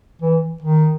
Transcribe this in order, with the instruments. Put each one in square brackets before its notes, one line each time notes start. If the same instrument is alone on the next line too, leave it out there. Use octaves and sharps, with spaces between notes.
[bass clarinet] E3
D#3